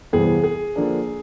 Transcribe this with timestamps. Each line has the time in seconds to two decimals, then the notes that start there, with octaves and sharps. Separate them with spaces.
0.12 E2 C3 E3 G3 B3 G#4
0.44 G#4
0.76 D3 F3 A#3 D4